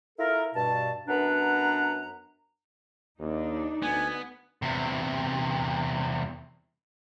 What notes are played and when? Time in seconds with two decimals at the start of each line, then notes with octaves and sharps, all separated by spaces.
0.19 E4 F4 A4 A#4
0.55 G2 B2 A5
1.08 F#2 B3 D4 B4 F#5 A#5
3.19 D#2 D4 D#4
3.83 D2 B3 G#5
4.62 E2 C3